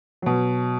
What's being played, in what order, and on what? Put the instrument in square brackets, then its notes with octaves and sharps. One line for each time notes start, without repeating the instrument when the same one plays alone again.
[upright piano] B2 F#3